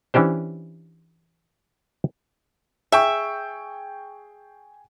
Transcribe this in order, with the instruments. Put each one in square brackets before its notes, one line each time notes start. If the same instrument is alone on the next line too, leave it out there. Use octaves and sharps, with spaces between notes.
[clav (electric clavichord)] E3 C#4 D4 G4 C5
[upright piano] G#4 G5 C#6 [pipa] E5